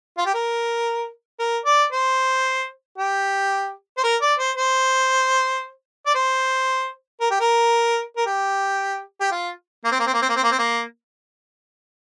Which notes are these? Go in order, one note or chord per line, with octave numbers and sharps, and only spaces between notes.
F4
G4
A#4
A#4
D5
C5
G4
C5
A#4
D5
C5
C5
D5
C5
A#4
G4
A#4
A#4
G4
G4
F4
A#3
C4
A#3
C4
A#3
C4
A#3
C4
A#3
C4
A#3